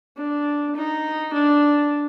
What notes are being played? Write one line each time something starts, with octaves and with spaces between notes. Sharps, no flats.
D4
D#4
D4